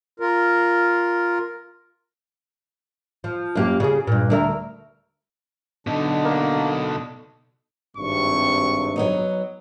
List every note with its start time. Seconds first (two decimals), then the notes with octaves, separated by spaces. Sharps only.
0.20 F4 A#4
3.24 F3
3.55 F#2 A#3 G4
3.80 C#3 G#4
4.07 G2 A#2
4.30 D2 A#4 E5
5.87 B2 D3 D4 D#4
6.25 A#3
7.97 G#1 G2 C3 C#6
8.96 F#3 B3 D#4